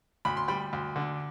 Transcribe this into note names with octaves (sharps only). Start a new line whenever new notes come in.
D2 B5
C6
G3 G5 B5
D2
D3